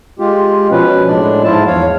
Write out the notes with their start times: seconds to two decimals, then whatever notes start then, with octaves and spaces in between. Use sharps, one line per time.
0.19 G#3 F4 G4
0.71 B2 F3 C#4 B4
1.07 A2 G#3 D4 D5
1.44 G#2 F3 E4 F4 A5
1.67 E2 C#5 F5